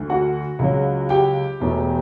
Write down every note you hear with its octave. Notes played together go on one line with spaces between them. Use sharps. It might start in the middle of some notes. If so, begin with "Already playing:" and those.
Already playing: D2 D3 A3
F#4 F#5
C#2 C#3 F#3
G4 G5
E1 E2 B2 A3